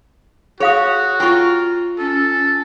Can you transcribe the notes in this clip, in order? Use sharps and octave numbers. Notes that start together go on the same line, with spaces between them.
F#4 G#4 C#5 F5 D#6
F4 A#4 G5 C#6
C#4 A4